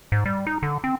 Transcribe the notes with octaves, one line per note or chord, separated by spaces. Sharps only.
G#2
G3
D#4
D3
C4